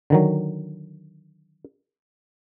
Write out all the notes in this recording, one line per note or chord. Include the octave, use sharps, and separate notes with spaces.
D3 D#3 F#3